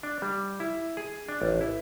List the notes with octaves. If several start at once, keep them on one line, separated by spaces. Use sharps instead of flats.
D4
G3
E4
G#4
D4
A1
E4